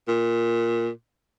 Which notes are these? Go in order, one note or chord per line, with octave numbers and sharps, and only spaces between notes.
A#2